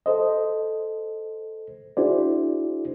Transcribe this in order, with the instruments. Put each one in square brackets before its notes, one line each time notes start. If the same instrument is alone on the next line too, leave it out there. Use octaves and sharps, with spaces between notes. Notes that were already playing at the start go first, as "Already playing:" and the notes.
[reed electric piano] A4 C5 D#5
D4 E4 F#4 G#4 C5 D5